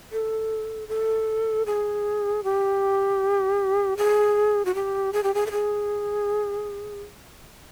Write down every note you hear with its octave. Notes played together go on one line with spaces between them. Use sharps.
A4
A4
G#4
G4
G#4
F#4
G4
G#4
G4
G#4
A4
G#4